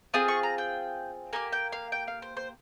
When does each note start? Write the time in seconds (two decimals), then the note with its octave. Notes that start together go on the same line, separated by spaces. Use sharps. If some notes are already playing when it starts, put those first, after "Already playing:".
0.14 C4 F4 G#4 D#6
0.28 C#6
0.43 A#5
0.58 G5
1.33 A#3 D#4 G4 G#5
1.53 G5
1.72 F5
1.92 G5
2.07 F5
2.22 C5
2.37 C5